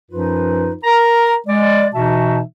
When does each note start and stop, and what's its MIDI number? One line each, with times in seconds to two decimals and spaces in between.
0.11 0.73 42
0.11 0.73 53
0.11 0.73 63
0.11 0.73 65
0.11 0.73 71
0.83 1.35 70
0.83 1.35 82
1.47 1.87 56
1.47 1.87 74
1.93 2.39 47
1.93 2.39 52
1.93 2.39 63
1.93 2.39 66
1.93 2.39 76
1.93 2.39 81